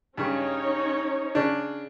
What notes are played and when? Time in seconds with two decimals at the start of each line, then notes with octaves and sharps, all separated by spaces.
0.18 G2 C#3 C#4 D#4 C#5
1.35 C#3 D4